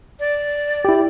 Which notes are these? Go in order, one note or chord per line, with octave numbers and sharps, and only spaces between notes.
D5
E4 G4